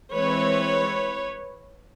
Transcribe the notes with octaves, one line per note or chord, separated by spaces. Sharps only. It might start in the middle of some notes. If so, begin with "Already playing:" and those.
E3 G#3 C4 B4 C#5